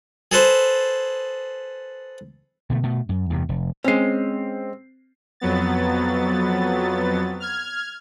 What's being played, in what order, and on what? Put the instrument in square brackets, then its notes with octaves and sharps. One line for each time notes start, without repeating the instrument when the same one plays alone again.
[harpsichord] G#4 A4 B4 C5
[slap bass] B2 D3 F3 A3
B2 A3
F#2
E2 G2 C3
F1
[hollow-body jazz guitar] G#3 C#4 [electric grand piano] C4 C7
[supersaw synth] F2 F#3 B3 A6
F6 G#6